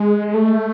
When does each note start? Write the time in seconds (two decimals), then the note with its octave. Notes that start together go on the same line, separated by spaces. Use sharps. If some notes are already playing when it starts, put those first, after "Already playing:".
Already playing: G#3
0.34 A3